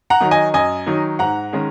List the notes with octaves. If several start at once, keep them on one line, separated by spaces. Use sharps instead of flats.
F#5 A#5
D#3 F#3 D#4
D#5 G#5
F#2 D#5 G#5
D#3 F#3 D#4
G#2 F#5 A#5
D#3 G#3 C#4